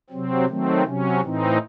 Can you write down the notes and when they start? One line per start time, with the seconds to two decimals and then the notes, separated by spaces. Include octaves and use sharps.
0.10 C3 F#3 C4
0.48 D#3 F#3 A3 C4
0.84 C3 F#3 C#4
1.22 A2 E3 C4 D#4